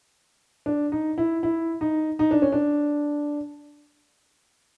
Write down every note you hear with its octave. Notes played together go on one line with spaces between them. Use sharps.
D4
D#4
E4
E4
D#4
D#4
D4
C#4
D4